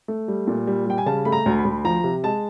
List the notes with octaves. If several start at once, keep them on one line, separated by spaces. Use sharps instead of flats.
A3
G3
A#2
G3
G3 G5
G#5
C#3 A5
A3 B5
A#5
D2
B5
D2
F3 A#5
C3
G#3 A5